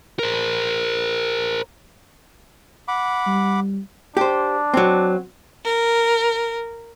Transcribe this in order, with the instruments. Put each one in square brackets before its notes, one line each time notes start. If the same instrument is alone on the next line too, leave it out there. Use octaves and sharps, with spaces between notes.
[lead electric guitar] A#4 C5
[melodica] F#5 B5 D6
[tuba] G3
[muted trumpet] D4 [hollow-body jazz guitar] G4 C5
[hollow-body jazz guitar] F#3 C4
[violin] A#4